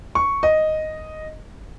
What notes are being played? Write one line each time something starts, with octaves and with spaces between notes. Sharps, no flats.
C#6
D#5